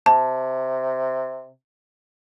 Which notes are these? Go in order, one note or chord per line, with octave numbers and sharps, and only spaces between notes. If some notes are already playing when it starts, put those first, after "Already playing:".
C3 A5